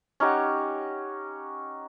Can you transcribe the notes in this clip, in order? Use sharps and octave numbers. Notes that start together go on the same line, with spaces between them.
C#4 D#4 G4 F#5